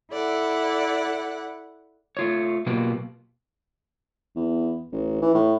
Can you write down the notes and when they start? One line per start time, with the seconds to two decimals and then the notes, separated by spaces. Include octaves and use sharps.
0.12 E4 A4 D5 F#5
2.17 A3 F4 C#5
2.66 B2 F#3 A#3 F4 G4 B4
4.36 E2
4.92 A1
5.22 E3
5.34 A2